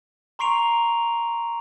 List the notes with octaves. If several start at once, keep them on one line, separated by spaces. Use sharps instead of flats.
A#5 C6 C#6 C7 D7 F7